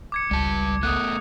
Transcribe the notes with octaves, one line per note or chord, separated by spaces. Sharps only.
D6 G#6 C#7
G#1 C#2 G3 A5
A3 B3 D#6 F#6